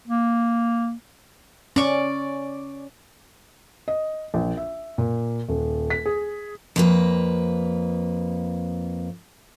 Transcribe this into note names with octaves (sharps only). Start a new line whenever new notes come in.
A#3
C#4 D5 C#6
D#5
A#1
E5
A#2
D#1
B6
G#4
F2 A#3 B4